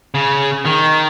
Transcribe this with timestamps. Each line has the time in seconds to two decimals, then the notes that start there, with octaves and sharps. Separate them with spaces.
0.14 C#3
0.65 D#3